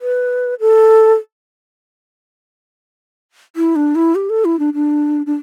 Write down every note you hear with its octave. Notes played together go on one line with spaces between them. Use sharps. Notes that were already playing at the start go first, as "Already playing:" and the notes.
B4
A4
E4
D4
E4
G4
A4
E4
D4
D4
D4